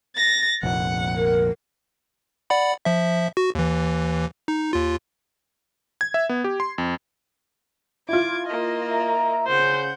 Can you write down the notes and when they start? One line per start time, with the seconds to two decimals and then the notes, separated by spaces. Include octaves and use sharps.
0.16 A6 A#6
0.63 F1 A#1 F#5
1.17 A#4
2.50 D5 F#5 B5
2.85 F3 E5
3.37 F#4
3.55 D#2 E3
4.48 D#4
4.73 D#2 F4
6.01 G#6
6.14 E5
6.29 B3
6.44 G4
6.60 C6
6.78 F2
8.09 E4 F4 D6 G#6
8.46 A#3 D#5
8.89 E5 A#5
9.48 C#3 C5 F#5 G6